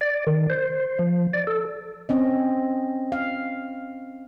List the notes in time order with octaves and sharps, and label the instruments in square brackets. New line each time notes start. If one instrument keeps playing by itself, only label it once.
[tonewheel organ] D5
D#3
C5
F3
D5
A4
[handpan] C4 C#4 D#5
F5